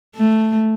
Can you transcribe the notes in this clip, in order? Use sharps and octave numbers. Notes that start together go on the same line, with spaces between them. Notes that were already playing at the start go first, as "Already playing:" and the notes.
A3